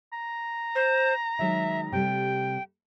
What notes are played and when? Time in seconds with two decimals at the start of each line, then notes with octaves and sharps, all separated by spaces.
0.12 A#5
0.75 C5
1.39 D#3 F#3 G#3 E5
1.92 C3 G3 A3 G5